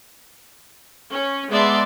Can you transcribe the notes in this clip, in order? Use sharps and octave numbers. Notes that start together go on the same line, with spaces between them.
C#4
G#3 B3 D5 E5 A5 C6